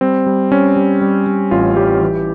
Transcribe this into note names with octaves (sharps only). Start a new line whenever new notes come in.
G3 C4
G3
G3 C#4
G3
G3
G3
A1 F4
G3 G4
E3